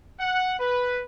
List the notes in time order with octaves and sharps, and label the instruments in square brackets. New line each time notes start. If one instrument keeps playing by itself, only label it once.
[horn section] F#5
B4